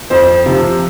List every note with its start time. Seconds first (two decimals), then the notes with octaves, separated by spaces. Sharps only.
0.10 F2 C5
0.46 C3 F3